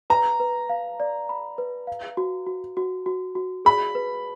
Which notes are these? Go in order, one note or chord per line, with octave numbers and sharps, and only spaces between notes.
B4 A#5
B4
F5
D5
B5
B4
F5
F#4
F#4
F#4
F#4
F#4
G#4 B5
B4